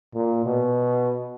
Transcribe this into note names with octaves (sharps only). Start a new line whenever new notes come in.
A#2
B2